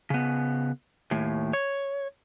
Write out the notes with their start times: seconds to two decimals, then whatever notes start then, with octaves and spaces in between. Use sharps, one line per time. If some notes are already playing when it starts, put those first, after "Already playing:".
0.10 C#3 B3
1.11 D#2 A2
1.53 C#5